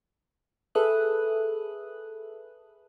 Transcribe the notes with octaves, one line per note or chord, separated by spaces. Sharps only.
G#4 A4 B4 E5 D#6 F#6